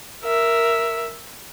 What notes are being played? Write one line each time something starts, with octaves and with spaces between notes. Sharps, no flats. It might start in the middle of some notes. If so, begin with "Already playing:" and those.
A#4 E5